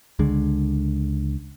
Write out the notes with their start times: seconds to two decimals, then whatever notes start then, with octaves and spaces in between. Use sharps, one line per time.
0.19 C#2 D3 G#3